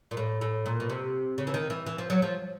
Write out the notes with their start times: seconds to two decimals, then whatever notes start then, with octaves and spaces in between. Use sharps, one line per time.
0.11 A#2
0.17 A2
0.41 A2
0.66 A#2
0.80 B2
0.90 C3
1.38 C#3
1.47 E3
1.54 D#3
1.70 E3
1.86 E3
1.98 F3
2.10 F#3
2.22 F3